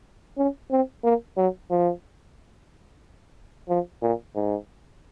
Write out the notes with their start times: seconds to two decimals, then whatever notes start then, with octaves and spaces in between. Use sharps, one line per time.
0.38 C#4
0.71 C4
1.04 A#3
1.37 F#3
1.71 F3
3.69 F3
4.02 A#2
4.35 G#2